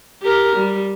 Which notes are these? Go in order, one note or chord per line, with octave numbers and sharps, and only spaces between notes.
G4 A#4
G3